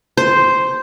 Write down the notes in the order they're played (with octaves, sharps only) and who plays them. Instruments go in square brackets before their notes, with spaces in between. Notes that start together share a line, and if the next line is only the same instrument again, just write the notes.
[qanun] C5